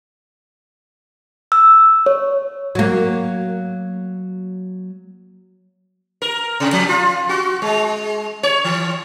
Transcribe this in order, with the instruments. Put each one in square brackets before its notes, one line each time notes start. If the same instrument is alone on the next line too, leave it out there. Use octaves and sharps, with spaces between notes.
[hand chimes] E6
C#5
[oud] F#3 A#3
[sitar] A#4
C3
F3
F4
F#4
G#3
C#5
E3